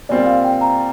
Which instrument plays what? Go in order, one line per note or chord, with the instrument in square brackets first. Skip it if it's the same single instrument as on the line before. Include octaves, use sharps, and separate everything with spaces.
[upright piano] A#2 G3 C4 F4 [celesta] D5
[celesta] F5
G5
A#5